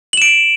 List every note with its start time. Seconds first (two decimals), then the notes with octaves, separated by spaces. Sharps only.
0.13 F#7
0.17 E7
0.22 D7